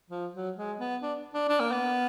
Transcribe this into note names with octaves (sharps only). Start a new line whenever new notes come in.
F3
F#3
G#3
B3
D4
D4
D4
A#3
B3